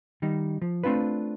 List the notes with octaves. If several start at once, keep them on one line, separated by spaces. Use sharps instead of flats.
D#3 G3 D#4
F3
A3 C4 D4 F4 B4